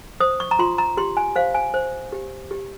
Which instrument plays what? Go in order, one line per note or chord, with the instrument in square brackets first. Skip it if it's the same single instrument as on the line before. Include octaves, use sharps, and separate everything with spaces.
[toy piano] C5 D#6
C#6
A#5
F4 C6
A#5
G4 C6
G#5
C5 F5
G#5
C5
G4
G4